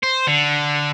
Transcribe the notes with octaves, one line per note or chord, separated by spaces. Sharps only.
C5
D3